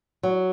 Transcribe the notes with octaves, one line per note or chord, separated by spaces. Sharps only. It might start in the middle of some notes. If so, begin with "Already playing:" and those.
F#3